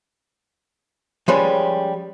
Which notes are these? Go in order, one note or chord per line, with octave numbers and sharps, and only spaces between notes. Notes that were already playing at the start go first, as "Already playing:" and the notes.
F3 G3 G#3 C#4 B4